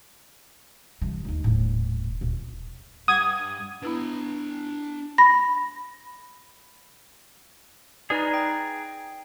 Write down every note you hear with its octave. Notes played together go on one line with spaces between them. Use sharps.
C2 E3
D#2 D#4
D#1 A2
D#1
G2 F#5 D6 D#6 G#6
B3 D4 E4 B4 A#5
B5 A#6
D#4 G#4 B4 D5 G#5 A#5
G5